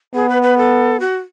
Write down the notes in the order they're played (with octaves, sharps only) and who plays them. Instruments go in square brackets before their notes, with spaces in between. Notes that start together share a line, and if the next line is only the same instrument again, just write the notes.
[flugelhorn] B3 [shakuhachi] G#4
[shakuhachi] B4
B4
A4
F#4